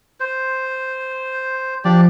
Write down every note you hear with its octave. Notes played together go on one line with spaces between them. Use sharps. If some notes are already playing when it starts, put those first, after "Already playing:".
C5
F3 D4 G4 D5